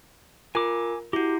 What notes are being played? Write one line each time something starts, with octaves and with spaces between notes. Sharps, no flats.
F4 A#4 G#5 D6
E4 F#4 G4